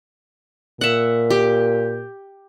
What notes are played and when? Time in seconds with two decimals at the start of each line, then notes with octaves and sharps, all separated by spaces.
0.81 A#2 E5 F#5
1.30 G4